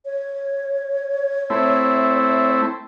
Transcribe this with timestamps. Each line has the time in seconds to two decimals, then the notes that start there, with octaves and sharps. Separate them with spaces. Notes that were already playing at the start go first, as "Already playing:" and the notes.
0.05 C#5
1.50 A3 C4 E4